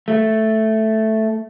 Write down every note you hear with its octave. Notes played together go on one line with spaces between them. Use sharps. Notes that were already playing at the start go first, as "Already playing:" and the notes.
A3